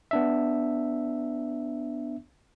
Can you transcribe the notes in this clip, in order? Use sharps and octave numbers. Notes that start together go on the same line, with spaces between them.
B3 D4 E5